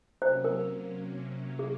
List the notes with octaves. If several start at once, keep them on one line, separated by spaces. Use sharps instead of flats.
C3 F#3 A#3 C#4 C5
A#4
G#4